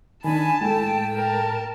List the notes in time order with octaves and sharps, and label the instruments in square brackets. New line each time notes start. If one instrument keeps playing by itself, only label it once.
[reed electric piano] D#3 D4 [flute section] G#5 B5 [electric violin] A5
[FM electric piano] A2 A4 [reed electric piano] G#3 [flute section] G5
[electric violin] A#4 A5